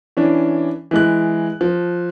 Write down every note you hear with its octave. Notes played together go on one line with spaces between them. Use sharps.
E3 C#4 D4
E3 G#3 F#6
F3